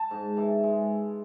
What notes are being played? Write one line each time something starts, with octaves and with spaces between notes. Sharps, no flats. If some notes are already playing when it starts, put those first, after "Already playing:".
Already playing: A5
G#2
E3
G#3